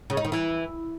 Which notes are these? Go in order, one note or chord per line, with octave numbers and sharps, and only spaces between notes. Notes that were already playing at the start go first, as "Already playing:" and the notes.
C#3
D#4
D#3
E3